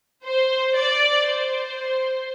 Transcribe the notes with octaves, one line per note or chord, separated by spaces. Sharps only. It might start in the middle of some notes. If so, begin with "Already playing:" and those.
C5
D5
C5